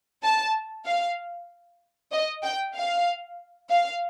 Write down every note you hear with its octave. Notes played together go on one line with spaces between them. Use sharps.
A5
F5
D#5
G5
F5
F5